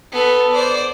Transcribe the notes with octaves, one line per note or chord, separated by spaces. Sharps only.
B3 A4
C5 D5